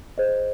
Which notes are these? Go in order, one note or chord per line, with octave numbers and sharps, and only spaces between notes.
G#4 C5 D#5